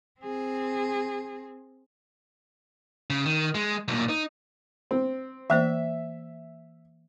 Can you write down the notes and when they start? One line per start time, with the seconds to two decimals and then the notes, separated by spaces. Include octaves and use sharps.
0.20 C4 G#4
3.10 C#3
3.25 D#3
3.55 G#3
3.88 B1 A#2
4.09 D#4
4.91 C4
5.50 E3 A#3 C5 E5